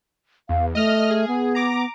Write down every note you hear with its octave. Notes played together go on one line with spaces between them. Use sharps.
E2 F5
A3 D#5 F6
G#4
B3
A#5 D6